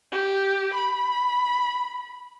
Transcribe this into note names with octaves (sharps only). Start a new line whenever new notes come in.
G4
B5